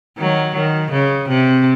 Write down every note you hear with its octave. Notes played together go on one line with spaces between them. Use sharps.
D#3 F#3
D#3
C#3
C3